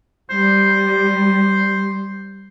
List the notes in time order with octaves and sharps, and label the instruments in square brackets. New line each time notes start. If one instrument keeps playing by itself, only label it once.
[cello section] G3 [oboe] C5